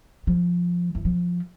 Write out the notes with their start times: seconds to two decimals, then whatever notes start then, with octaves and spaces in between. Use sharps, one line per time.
0.27 F3
0.95 E3
1.05 F3